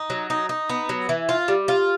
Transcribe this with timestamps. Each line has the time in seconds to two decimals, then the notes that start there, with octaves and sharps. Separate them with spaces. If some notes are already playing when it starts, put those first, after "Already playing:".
Already playing: D#4
0.10 F#3
0.30 D#4
0.49 D#4
0.69 B3
0.89 F#3
1.09 E3
1.29 F4
1.48 G3
1.68 F4